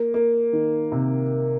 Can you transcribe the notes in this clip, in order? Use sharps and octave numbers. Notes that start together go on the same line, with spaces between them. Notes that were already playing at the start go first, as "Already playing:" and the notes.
Already playing: A#3
A#3
D#3
C3